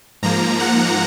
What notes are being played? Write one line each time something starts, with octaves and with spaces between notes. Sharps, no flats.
G#2 F3 A#3 A#5
F#5